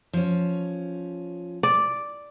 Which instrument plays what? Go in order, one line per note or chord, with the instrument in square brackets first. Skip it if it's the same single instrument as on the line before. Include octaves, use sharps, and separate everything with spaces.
[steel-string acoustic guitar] F3 C#4
[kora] D5